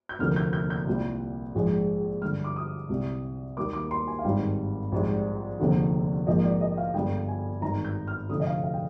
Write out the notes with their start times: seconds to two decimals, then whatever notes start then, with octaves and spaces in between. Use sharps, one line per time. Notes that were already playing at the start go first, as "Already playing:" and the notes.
0.09 G6
0.19 F1 D#2 D3 F3 A#3 F6
0.36 G6
0.53 G6
0.70 G6
0.87 C2 A#2 G3
1.55 A#1 G#2 F3 G#3
2.22 G2 D3 G3 F6
2.44 D6
2.56 D#6
2.89 C2 C3 G3
3.57 D#2 D#3 G3 A#3 D6
3.73 D6
3.91 C6
4.07 G#5
4.19 F5
4.24 G#1 G2 D#3 G3 G5
4.92 A#1 G#2 G3
5.59 F1 D#2 D3 F3
6.27 A#1 G#2 F3 A#3 D#5
6.44 D5
6.61 D#5
6.77 F5
6.94 G1 G2 D3 G5
7.28 G#5
7.61 G#1 G2 D#3 A#5
7.85 G6
8.07 F6
8.29 F1 F2 D3 D#6
8.40 D#5
8.47 F5
8.64 F5
8.74 G5